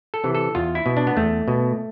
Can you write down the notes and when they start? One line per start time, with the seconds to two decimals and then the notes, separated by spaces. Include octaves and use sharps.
0.14 A4
0.24 C3 E3
0.35 A4
0.55 E2 F4
0.75 E4
0.86 B2
0.97 D4
1.07 B3
1.17 E2 A3
1.48 B2